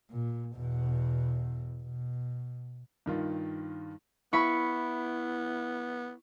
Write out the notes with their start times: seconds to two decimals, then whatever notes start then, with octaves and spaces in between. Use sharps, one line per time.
0.10 A#2
0.56 E2 B2
1.83 B2
3.06 G2 D#3 F4
4.33 B3 E4 B5 C#6